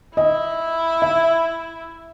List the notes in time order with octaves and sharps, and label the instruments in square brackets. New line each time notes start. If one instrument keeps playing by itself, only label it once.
[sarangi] E4 [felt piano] D#5
[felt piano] E5